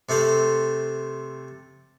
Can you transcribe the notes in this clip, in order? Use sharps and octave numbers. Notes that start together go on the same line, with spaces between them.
C3 A3 C4 A4